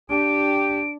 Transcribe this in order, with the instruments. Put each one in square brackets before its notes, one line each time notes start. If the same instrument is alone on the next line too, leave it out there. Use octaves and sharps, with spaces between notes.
[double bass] D4 [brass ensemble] G4 [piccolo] D7